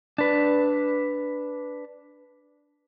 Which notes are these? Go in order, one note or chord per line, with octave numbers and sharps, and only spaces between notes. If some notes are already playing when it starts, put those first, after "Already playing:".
D4 B4